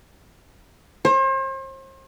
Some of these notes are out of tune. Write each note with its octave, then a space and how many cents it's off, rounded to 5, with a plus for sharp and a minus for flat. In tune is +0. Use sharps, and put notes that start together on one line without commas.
C5 +40